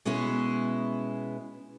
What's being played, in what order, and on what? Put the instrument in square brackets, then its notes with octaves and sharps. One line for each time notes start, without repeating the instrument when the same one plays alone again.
[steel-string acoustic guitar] B2 G#3 B3 C#4 E4